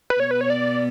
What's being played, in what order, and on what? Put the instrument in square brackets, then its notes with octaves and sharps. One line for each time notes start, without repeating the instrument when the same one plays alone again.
[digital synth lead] B4
[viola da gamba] B2 B3 [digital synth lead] C#5
[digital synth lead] B4
C#5
D5